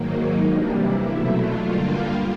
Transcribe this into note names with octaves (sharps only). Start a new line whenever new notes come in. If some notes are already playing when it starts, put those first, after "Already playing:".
Already playing: G#2 D#3 F#3 A#3
D#4
C3 E3 G3 A#3 D4
E4
B2 F#3 A3
F4
G2 D3 G3 A#3